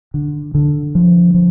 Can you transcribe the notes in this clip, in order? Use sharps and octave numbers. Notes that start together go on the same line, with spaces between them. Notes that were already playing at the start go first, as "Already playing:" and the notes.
D3
D3
F3
F3